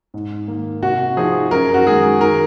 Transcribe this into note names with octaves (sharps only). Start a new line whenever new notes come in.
G#2
D#3 A#3
C3 F#4
F3 C4 D#4 G#4
F#2 A#4
F#4
D#3 G#3 G#4
D#3 A#4